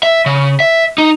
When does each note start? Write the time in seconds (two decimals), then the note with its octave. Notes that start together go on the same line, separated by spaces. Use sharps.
0.03 E5
0.26 C#3
0.60 E5
0.98 D#4